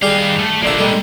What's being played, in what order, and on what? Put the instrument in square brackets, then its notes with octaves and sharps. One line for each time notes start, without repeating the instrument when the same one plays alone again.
[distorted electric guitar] D#3 F5 [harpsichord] G3 G4 G#4
[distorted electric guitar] A3
[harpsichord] A#1 D3 E5 [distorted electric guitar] A#3 D4
[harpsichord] G3 G#3 A4